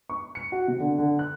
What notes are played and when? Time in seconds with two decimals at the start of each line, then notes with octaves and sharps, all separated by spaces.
0.10 C#6
0.35 C#7
0.52 F#4
0.68 C3
0.80 D3
0.98 D3
1.19 F#6